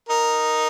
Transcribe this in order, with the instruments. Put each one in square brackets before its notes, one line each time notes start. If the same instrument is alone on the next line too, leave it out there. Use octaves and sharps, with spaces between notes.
[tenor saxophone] D#4 [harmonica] A#4